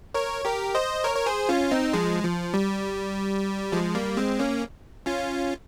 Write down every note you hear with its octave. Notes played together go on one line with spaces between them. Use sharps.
A#4 C#5
G4 A#4
C5 D#5
A#4 C#5
C#5
G#4 C5
C#4 F4
C4 D#4
F3 G#3
F3
G3
F3 G#3
G3 A#3
G#3 C4
A#3 C#4
C#4 F4